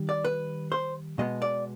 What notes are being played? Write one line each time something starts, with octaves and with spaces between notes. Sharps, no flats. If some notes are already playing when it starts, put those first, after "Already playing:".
Already playing: D#3 G3
D5
B4
C5
B2 G#3 B3 D#5
D5